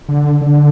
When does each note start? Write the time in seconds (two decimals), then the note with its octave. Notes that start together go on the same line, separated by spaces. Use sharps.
0.08 D3
0.41 D3